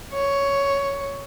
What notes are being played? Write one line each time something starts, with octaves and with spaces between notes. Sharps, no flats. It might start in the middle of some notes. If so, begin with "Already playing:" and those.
C#5